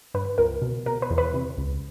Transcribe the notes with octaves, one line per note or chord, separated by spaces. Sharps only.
G2 B4
C#2 A#4
B2
B2 A#4
B4
E2
B4
C3
C#2